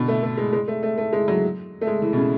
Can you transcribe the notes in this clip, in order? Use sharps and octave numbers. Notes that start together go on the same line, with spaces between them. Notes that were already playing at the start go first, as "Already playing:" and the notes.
Already playing: B2 D3
A3
A3
G#3
G#3
A3
A3
A3
G#3
F#3
A3
G#3
E3
B2
C#3